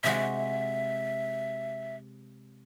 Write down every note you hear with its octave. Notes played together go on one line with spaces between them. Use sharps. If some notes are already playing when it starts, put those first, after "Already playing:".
C3 G#3 F#4 E5